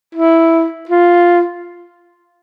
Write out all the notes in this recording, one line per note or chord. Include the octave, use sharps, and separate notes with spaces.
E4
F4